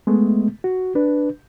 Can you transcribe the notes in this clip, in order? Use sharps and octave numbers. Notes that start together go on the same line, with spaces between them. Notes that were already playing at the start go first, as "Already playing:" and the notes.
G#3 A3 B3
F#4
D4 B4